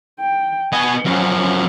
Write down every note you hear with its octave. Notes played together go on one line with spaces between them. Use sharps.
G5
B3 D#5 G#5
F#2 F3 F#3 C#4